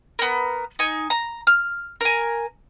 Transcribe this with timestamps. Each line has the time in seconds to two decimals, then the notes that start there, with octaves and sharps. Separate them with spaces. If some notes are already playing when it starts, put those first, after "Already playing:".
0.19 B3 A#4
0.79 D#4 G#5
1.10 A#5
1.47 F6
2.01 A#4 G#5